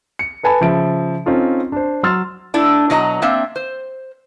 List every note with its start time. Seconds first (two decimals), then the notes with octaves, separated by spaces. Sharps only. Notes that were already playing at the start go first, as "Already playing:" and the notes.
0.19 C#7
0.43 A4 B4 G#5 A5 B5
0.61 C#3 F3 E5 D7
1.26 C4 C#4 D#4 F4 A4
1.72 D4 C5
2.03 F#3 C6 E6 F6 A6
2.54 A3 D4 E4
2.90 B2 F#3 D#5 A#5
3.22 A#3 C4 D4 E5
3.56 C5